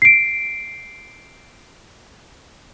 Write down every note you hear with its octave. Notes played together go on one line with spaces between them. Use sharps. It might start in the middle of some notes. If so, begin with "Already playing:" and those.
C7 D7